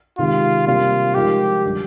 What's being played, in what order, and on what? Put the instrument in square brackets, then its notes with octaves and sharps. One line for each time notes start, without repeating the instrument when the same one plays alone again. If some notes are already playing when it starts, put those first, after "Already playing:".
[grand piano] C3 D#3 G#3 C4 G4 [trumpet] F4
[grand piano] C3 G3 A#3 D4 [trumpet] F4
[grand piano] F3 G#3 D#4 A#4 [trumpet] G4
[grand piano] D3 G3